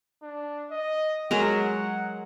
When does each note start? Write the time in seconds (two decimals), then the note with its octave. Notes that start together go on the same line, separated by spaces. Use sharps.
0.23 D4
0.71 D#5
1.31 F#3 G#3 A#4 F#5